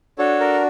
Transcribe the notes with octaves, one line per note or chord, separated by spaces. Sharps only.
D4 F#4 A4 C#5
A#4